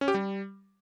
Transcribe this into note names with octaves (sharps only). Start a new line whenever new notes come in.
C#4
G4
G3